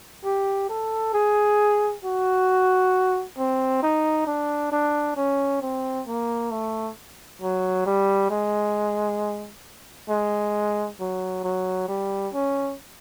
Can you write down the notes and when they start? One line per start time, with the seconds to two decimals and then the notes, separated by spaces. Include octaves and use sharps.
0.25 G4
0.69 A4
1.14 G#4
2.04 F#4
3.38 C4
3.83 D#4
4.27 D4
4.72 D4
5.17 C#4
5.62 C4
6.08 A#3
6.51 A3
7.42 F#3
7.86 G3
8.30 G#3
10.10 G#3
11.00 F#3
11.44 F#3
11.89 G3
12.34 C#4